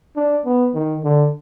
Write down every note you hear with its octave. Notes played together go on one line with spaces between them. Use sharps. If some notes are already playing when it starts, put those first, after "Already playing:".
D4
B3
D#3
D3